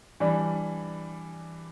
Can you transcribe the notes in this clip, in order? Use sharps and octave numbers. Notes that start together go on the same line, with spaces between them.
E3 G3 D4